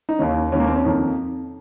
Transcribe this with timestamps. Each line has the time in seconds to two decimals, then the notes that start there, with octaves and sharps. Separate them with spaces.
0.09 D#4
0.19 D#2 D#3 C#4
0.52 D#2 C#4
0.55 D#3 A#3
0.67 C4
0.76 C#4
0.85 F2 D#3